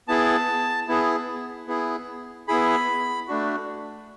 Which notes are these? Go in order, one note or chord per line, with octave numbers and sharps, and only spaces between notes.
B3 E4 G#4 A5
B3 E4 G#4
B3 E4 G#4
B3 E4 G#4 B5
A3 D4 F#4